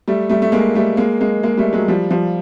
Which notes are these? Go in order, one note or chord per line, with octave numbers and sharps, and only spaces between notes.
G3 A3
G3 A3
A3
G#3 A#3
G3 A3
G#3 A#3
G#3 A#3
G#3 A#3
G3 A3
F#3 G#3
F3 G3
F3 G3